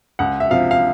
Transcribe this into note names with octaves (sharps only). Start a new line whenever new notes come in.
C#2 F#5
E5
C3 F3 F5
F5